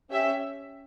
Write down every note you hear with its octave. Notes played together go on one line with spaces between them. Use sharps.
C#4 G4 E5